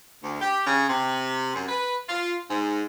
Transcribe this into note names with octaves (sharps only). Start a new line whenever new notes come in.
D2
G4
C#3
C3
F#2
B4
F4
G#2